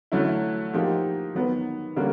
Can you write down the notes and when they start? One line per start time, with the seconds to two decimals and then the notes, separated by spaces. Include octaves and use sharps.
0.12 D3 F#3 A3 C#4 E4
0.74 F3 A#3 D#4 G4
1.35 D#3 F#3 B3
1.96 D3 G3 A#3 C#4